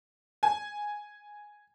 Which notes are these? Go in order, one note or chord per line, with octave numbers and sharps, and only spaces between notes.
G#5